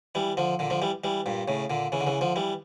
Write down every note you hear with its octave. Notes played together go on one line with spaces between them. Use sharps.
E3 G3
D3 F3
A#2 D3
D3 F3
E3 G3
E3 G3
G2 A#2
A2 C#3
A#2 D3
C#3 E3
D3
C#3 E3
D3 F3
E3 G3